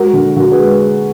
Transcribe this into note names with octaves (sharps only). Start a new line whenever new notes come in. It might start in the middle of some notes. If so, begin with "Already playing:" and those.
Already playing: G#3 F#4 A#4
D3
D3 F#4 A#4
G#4 B4
G#3